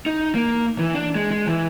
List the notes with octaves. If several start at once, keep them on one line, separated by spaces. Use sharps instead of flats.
D#4
A#3
E3
D4
G#3
G#3
E3